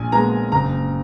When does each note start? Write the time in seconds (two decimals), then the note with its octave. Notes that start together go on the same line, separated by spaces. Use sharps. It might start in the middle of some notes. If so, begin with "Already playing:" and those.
Already playing: A#1 G#5
0.12 A#2 G#3 B3 A#5
0.52 F#1 A#5